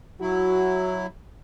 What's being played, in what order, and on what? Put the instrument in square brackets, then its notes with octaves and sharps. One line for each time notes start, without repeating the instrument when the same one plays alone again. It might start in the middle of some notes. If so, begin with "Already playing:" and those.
[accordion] F#3 E4 [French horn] F#4